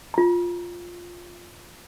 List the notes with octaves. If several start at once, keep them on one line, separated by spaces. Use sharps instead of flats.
F4 A#5